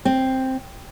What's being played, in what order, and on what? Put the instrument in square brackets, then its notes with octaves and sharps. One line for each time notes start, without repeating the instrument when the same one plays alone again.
[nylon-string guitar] C4